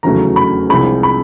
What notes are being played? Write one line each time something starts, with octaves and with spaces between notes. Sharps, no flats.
F1 E2 C#3 F#3 A3 A#5
B5
C2 C3 F3 G#3 B5
B5